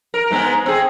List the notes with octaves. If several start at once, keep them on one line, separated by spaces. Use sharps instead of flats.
A#4
G#2 G#3 B3
C4 G#4